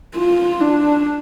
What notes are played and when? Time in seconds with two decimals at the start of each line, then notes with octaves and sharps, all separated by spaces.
0.16 F4
0.61 D4